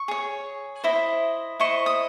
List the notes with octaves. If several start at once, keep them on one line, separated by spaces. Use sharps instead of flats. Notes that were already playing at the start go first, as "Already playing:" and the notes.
Already playing: C#6
G#4 C#5
E4 C5 D#5
E4 C5 D#5 C#6
D#6